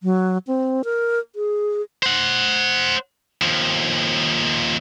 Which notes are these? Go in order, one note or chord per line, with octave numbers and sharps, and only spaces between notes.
F#3
C4
A#4
G#4
C5 F#5
D#2 F3